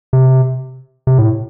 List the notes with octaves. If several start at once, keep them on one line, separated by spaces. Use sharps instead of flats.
C3
C3
A2